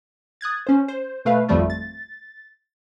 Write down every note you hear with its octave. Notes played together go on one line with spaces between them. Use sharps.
D#6 F#6 G#6 A6
C#4 C5
C5
B2 A3 B4 F5
G#1 F2 F3 G3 A3 F4
A6